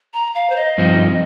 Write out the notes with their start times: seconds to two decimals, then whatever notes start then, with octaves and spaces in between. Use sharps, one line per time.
0.13 A#5
0.35 F5
0.50 C5
0.56 D#5
0.78 G2 F3 C4 D#4